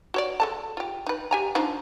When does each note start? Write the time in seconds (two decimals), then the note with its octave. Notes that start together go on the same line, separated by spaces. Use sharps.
0.14 F#4 C#5 D5
0.40 G#3 A4 A5
0.77 F4 G4
1.06 D#4 B4
1.31 G4 G#5 A#5
1.55 F3 D4 D#4